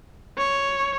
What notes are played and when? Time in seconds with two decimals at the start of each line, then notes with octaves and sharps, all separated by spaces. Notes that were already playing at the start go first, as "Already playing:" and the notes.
0.38 C#5